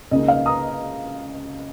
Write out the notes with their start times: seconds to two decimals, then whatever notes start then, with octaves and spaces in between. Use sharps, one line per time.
0.11 C#2 C#3 A#3 D#4 D#5
0.28 F5
0.46 A#5 D#6